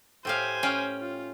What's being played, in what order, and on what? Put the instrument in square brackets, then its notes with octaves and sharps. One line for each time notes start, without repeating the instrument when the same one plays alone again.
[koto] A2 G4 F5 [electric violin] C5 G#5
[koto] C#4 F5 G5
[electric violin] F4